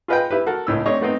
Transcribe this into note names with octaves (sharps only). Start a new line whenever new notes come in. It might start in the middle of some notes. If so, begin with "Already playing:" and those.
F4 G#4 B4 D#5 F#5 G5
E4 G4 B4
F#4 A4 A#4
C#2 A2 E6
A3 C4 D4 C#5 D#5
A3 B3 C4 D#4